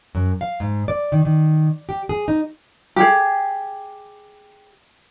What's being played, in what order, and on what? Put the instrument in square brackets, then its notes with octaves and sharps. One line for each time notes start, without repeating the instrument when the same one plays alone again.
[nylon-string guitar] F#2
F5
G#2
D5
D#3
D#3
G4
G#4
D#4
[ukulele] G4 G#4